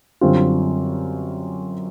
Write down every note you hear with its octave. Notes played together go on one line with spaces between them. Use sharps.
F#2 D3 G3 C4 F4